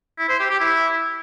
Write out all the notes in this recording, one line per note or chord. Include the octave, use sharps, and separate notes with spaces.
E4
C5
G4
G4
E4